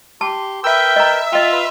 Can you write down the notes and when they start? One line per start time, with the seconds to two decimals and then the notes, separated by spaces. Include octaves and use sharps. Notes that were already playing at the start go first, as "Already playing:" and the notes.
0.21 G4 A5 C6
0.64 A#4 B4 E5 G5 E6
0.96 D#5 A#5
1.32 F4 D#5 G5
1.53 B4 C6